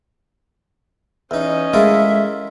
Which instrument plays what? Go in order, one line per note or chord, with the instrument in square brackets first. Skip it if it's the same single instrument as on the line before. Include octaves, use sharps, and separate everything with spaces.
[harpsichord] E2 D#4 [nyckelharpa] C#4 D#5
[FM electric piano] G#3 A3 [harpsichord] E4 F4 A#4 [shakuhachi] E5